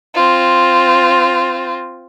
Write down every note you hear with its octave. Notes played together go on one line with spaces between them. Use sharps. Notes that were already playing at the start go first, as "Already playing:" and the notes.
C4 F4